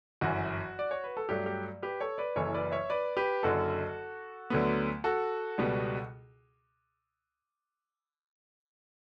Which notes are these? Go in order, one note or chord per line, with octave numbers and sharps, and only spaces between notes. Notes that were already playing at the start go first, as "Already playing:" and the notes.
G1 F#2 E3 F#4
D5
C#5
B4
A4
G2 F#3 A3 G4
G4
G4 B4
A4 C#5
B4 D5
F#1 F#2 E3 A4 C#5
B4 D5
C#5 E5
B4 D5
G4 B4
F#1 F#2 D3 F#4 A4
D2 D3 F#3 B3
F#4 A4
C#2 B2 G3 B3